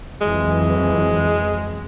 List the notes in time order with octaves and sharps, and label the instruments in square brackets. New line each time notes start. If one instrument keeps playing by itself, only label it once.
[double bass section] F2 E3 F#3 [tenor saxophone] G#3